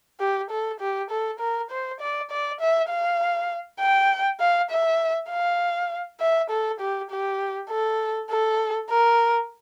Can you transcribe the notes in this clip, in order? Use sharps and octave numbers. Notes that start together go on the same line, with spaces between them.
G4
A4
G4
A4
A#4
C5
D5
D5
E5
F5
G5
F5
E5
F5
E5
A4
G4
G4
A4
A4
A#4